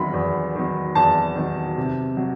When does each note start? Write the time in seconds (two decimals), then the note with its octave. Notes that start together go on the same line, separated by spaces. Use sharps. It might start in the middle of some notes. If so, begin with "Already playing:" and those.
Already playing: E2 D#3 F#3 B5 C6
0.14 E2
0.55 D#3 F#3
0.95 E2 A5
1.36 D#3 F#3
1.77 C3
2.17 F#3